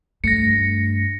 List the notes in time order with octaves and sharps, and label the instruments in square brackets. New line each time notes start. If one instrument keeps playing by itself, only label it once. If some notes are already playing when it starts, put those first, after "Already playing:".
[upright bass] G2 [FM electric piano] A3 [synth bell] A#6 C#7